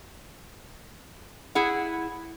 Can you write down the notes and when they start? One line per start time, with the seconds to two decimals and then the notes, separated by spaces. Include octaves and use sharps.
1.55 E4 G#4 F#5